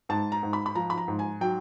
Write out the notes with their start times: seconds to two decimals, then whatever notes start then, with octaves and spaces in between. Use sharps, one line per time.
0.09 G#2 A5
0.32 A#5
0.43 G#2
0.53 B5
0.66 B5
0.75 F3 A#5
0.90 B5
0.98 A#5
1.08 G#2
1.19 G#5
1.41 F#3 G5